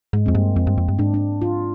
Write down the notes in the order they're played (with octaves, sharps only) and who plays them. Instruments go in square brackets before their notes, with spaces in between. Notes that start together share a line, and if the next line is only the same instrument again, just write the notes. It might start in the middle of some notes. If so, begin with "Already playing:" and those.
[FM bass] G#2 [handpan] G#3
[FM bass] F2 [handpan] C4
[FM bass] G2 [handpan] A#3
[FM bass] F2 [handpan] C4
[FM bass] G2
F2
G2
[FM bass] G#2 [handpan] D4
[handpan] D4
F4